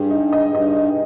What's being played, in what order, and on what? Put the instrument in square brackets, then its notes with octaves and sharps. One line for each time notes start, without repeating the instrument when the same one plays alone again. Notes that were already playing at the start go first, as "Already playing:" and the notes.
Already playing: [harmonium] G2 [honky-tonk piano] G#4
[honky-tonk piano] D#4
D#5
[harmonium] G2 [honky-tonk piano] D#5
[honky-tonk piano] D#4